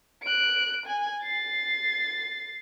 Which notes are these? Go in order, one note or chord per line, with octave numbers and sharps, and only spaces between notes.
F#6 D7
G#5
A6 C7